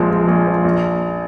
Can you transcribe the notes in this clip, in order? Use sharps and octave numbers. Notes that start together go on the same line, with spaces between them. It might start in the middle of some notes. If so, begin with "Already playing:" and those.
Already playing: A#1 F3 G#3
A#1
A#1
F3
A#1